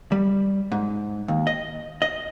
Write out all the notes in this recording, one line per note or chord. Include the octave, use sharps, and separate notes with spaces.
G3
G#2
D#2
D#5
D#5